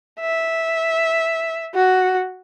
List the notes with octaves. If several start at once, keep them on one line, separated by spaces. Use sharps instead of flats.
E5
F#4